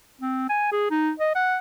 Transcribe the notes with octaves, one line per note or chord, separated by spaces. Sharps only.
C4
G#5
G#4
D#4
D#5
F#5